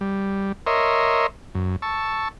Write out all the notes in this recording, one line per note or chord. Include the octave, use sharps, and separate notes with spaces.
G3
A#4 C#5 D#5 E5 C6
F#2
A5 C#6 E6